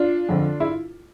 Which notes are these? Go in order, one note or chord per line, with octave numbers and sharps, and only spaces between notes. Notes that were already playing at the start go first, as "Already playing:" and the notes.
Already playing: D4 F4
F2 D3
E4